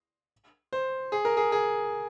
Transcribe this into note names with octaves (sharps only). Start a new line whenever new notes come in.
C5
G#4
A#4
G#4
G#4